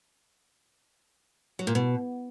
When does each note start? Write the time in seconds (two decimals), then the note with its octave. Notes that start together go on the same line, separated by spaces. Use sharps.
1.59 F#3
1.67 A#2
1.75 B2